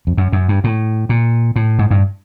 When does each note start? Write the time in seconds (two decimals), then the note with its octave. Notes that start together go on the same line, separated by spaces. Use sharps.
0.07 F2
0.17 F#2
0.32 F#2
0.48 G2
0.64 A2
1.09 A#2
1.56 A2
1.79 G#2
1.91 G2